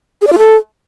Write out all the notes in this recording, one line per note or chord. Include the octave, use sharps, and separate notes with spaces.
G#4
D5
F4
A4